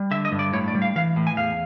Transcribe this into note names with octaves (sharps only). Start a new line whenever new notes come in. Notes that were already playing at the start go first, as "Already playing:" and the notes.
Already playing: G3
D3 E5
D#5
G2
D5
A2 C#5
D5
G3
F5
E3 F5
A2
G#5
E2 F5